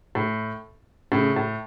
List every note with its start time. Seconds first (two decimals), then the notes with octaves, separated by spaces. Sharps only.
0.15 A2
1.12 A2 C#3
1.36 A2